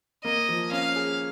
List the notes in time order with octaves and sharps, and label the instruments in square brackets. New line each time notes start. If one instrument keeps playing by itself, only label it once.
[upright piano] A#3 [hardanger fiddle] D#5
[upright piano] F3
[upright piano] C#4 [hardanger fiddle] F5
[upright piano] G#4